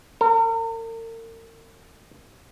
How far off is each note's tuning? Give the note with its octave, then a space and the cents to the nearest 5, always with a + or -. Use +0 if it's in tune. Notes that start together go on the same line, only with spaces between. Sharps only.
A#4 -40